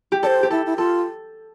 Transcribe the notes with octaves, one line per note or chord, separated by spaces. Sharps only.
G4
A4 C5 D5
G4
E4 A4
E4
F4 A4